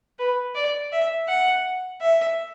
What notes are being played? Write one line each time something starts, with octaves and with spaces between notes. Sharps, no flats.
B4
D5
E5
F#5
E5